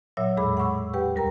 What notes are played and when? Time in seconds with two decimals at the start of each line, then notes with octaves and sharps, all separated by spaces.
0.17 A#2 F#3 C#5 E5 E6
0.37 E2 A2 G#3 G#4 B5 D6
0.57 F#5 B5 C#6 E6
0.94 G4 B4 F#5 G5
1.15 D2 G3 A#4 G5 A#5